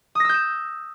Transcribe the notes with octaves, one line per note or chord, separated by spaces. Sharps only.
D#6 E6 G6 A#6 E7